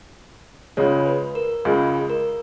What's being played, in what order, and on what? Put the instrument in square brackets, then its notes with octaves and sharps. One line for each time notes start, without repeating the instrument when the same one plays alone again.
[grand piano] C#2 C#3 G#3 [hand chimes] C#5
[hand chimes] B4
A#4
[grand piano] C#2 C#3 G#3 [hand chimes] G#4
[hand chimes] A#4